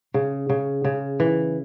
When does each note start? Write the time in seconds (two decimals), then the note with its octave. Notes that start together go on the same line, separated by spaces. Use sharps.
0.14 C#3
0.50 C#3
0.85 C#3
1.20 E3